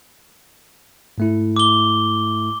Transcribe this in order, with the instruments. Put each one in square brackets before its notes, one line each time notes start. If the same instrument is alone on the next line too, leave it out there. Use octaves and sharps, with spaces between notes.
[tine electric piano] G#2 A3 E4
[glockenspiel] D6 G7